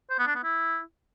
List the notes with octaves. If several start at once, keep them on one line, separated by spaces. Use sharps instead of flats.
C5
B3
D4
B3
E4